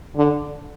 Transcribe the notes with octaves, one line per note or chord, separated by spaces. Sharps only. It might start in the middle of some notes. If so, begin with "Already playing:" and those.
D3